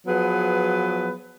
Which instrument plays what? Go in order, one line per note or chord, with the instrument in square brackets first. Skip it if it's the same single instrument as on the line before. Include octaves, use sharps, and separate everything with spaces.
[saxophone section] F3 F#3 B3 G#4 B4